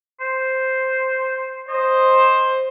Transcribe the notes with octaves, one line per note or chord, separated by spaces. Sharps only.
C5
C5 D#5